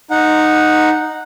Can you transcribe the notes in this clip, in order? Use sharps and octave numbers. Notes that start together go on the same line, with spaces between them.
D#4 F#5